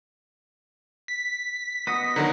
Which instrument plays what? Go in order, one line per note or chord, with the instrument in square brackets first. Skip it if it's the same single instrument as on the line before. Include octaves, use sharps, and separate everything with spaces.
[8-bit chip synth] B6
[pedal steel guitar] B3 F#4 D#5 [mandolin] D#6
[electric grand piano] D3 D#3 F#3 [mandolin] A#4 F#5